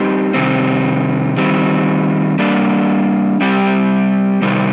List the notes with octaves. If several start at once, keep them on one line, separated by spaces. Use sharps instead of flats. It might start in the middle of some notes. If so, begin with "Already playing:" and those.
Already playing: G3 C4 D#4 G4
C3 D#3 G3 C4
D#3 G3 C4
G3 A#3 D4
G3 C4 G4
C3 D#3 G3